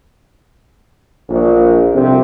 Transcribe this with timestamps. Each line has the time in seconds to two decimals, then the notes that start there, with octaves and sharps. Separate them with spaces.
1.29 A#1
1.93 C2 F2 C3